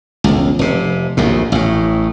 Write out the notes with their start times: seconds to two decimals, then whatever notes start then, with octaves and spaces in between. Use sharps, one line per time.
0.24 E1 C#2
0.59 F1 C3
1.17 A#1 D#2 A2
1.52 A1 A2